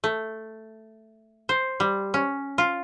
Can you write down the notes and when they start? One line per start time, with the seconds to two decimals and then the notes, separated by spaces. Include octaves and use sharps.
0.04 A3
1.49 C5
1.80 G3
2.14 C#4
2.58 F4